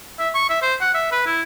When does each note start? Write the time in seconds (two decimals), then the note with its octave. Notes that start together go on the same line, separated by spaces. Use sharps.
0.19 E5
0.34 C#6
0.50 E5
0.62 C5
0.81 F#5
0.94 E5
1.12 B4
1.26 E4